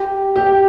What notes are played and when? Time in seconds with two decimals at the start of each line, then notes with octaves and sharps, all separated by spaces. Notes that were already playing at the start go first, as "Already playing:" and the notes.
Already playing: G4
0.36 G4